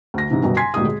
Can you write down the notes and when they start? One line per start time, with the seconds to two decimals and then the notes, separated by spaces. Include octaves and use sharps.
0.14 D2 A#6
0.30 G#2 C3 E3
0.42 G1 F#2 B2 G3
0.57 G#5 C6 G#6 B6 C7
0.74 G#1 D2 A#2 D#4 G4 D#6
0.85 G#3